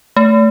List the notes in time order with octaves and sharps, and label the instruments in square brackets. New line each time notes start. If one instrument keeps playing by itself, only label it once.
[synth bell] A3